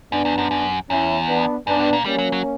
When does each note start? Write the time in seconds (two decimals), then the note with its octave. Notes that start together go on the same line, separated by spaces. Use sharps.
0.11 F#2 B3 D4
0.25 E2
0.38 F#2
0.51 F#2
0.89 E2 C#4 E4
1.28 B3 D4
1.67 F#2 B3 D4
1.79 G2
1.93 A#2
2.05 G3 A#3 C#4
2.18 F#3
2.32 F#3